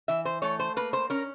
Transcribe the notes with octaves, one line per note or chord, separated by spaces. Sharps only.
E3 E5
C5
A3 C#5
C5
A#3 B4
C5
C#4 A#4